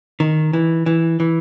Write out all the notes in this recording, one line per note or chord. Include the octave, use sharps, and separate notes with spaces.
D#3
E3
E3
E3